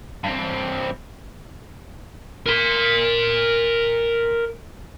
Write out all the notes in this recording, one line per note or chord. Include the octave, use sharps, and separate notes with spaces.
G2 C4
A#4 C6